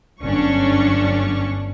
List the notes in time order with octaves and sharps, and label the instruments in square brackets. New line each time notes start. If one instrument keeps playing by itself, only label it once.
[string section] G1 F#2 C#4 D4 C#6